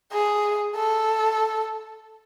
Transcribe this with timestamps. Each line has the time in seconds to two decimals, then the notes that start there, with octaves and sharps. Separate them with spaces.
0.12 G#4
0.75 A4